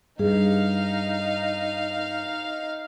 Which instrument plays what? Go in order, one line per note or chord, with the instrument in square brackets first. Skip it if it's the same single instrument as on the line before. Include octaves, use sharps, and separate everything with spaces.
[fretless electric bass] G2 [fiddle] D#4 F5 [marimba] G#4